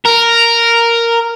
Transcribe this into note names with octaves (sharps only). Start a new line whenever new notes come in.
A#4